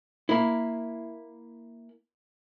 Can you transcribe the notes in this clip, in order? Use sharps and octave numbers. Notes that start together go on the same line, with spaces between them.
A#3 E4